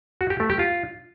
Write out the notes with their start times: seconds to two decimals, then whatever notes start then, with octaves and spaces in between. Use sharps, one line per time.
0.21 F#4
0.30 G4
0.40 A3
0.50 G4
0.59 F4